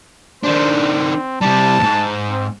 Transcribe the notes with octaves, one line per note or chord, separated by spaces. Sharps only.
D#3 D4 C5
C4
C3 G3 A5
E2 G#2
C4